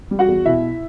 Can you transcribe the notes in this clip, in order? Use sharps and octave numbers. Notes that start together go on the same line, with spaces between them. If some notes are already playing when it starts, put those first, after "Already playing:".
G3
F#4 F#5
E2
B2 E4 E5